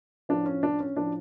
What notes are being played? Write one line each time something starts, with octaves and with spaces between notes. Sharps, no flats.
A2 F3 D4
C#4
D4
C#4
A2 F3 D4